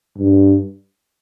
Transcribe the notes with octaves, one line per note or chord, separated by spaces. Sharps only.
G2